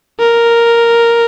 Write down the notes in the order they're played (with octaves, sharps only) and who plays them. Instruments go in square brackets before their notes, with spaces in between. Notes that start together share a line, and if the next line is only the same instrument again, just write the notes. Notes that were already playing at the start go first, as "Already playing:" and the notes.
[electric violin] A#4